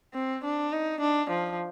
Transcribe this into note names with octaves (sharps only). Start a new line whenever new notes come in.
C4
D4
D#4
D4
F3